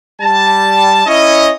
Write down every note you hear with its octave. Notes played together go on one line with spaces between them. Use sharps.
G3 A5
C#4 E4 C#5 D#5